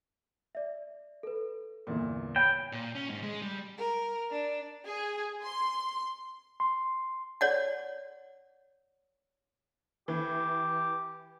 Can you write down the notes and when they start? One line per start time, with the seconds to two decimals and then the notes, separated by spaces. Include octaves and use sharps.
0.55 D5 E5
1.23 A4 B4
1.87 G1 E2 A#2
2.36 C#5 G5 B5
2.72 A#2
2.95 C#4
3.10 G#2
3.23 G#3
3.42 G3
3.77 A#4
4.31 D4
4.86 G#4
5.44 C6
6.60 C6
7.41 C#5 D5 F#5
10.08 E3 G4